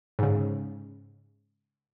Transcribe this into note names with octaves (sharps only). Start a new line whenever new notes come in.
G#2 C#3